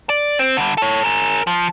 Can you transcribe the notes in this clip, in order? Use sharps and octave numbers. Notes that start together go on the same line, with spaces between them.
D5
C4
D3 G3
A4 C#5
G#4 A#4
F3